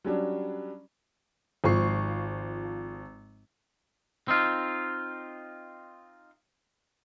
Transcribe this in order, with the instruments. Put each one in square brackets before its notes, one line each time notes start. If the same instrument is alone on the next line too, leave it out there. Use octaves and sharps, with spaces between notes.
[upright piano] F#3 G3 C#4 D4
[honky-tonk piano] G#1 F3 C#6 C7
[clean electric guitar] C4 D#4 F4